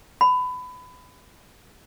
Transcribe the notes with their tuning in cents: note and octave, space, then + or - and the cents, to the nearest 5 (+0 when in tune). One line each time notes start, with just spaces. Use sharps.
B5 +20